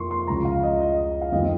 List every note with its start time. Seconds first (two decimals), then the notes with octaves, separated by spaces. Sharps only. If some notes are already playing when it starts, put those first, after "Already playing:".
Already playing: F2 F3 A#3 C6 C#6
0.11 C6
0.27 C#2 C#3 F3 A#5
0.45 F5
0.63 D#5
0.81 D#5
1.22 F5
1.32 F2 D#3 G3 C4 F4 D#5